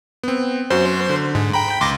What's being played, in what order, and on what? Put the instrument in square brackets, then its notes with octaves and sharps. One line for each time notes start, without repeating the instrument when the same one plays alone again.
[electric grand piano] B3 C4
[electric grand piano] F#2 F#4 [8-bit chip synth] C5
[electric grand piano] D3
[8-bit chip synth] G#2
[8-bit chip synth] G5 B5 [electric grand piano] A#5
[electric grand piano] C#2 [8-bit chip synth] C6 D6 A#6